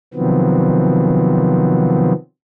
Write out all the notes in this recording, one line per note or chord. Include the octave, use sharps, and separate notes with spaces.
C3 D#3 F3 F#3 B3 C4